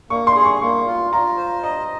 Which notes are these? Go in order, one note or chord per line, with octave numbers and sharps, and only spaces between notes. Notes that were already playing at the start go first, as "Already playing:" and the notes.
A#3 C#6
C6
G#4
C#6
A#3 C#6
F4
F4 A#5
C5
D#5 A#5